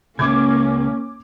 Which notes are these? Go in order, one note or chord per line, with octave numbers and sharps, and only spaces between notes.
C#3 G#3 A#3 C#4 D6 G#6